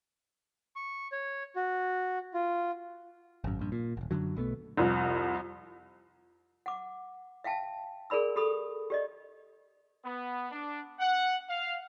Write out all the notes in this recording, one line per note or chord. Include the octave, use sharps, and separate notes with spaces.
C#6
C#5
F#4
F4
G#1 F#2
A#1 G2
A#2
D#1 G#1
F#2 A#2 D3 F#3
B1 B2 A3 B3
C2 F2
F#5 D6
E5 F5 G5 A5
G#4 A#4 D5 B5 E6
G4 A4 B5 D#6
G4 D5 D#5
B3
D4
F#5
F5